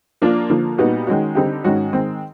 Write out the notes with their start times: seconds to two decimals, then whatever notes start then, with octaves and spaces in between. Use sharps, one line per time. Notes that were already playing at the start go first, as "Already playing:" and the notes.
0.22 F3 A#3 D4 F4
0.50 D3 F3 A#3
0.78 A#2 G3 B3 D#4 F#4
1.07 D#3 G#3 C#4 F#4
1.35 D3 G3 C4 D#4 G4
1.64 G#2 D#3 G#3 C#4 F#4
1.93 D#3 G#3 C4